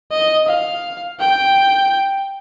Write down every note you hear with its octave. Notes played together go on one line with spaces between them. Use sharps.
D#5
F5
G5